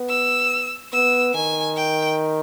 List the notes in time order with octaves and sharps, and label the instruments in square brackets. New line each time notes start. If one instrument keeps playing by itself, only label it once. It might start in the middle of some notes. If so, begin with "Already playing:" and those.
Already playing: [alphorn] B3
[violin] E6
[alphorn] B3 [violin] E6
[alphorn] D#3 [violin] G#5
[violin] G5